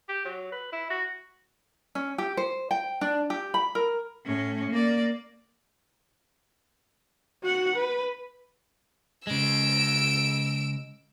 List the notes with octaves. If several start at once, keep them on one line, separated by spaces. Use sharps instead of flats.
G4
F#3
B4
E4
F#4
C#4
G4
C5
G5
D4
G4
B5
A#4
A2 C#4
A#3 D5
F#4 F#5
B4
C#3 G#3 E6 D7